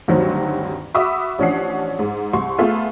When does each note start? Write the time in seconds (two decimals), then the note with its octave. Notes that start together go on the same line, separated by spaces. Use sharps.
0.08 D2 G2 D#3 F#3 C4 C#6
0.94 F#4 E5 B5 D6 D#6
1.39 A1 F3 C#4 D4 F#5 C7
1.99 G#2
2.33 C2 C6 C#6
2.58 A3 B3 F4 G#4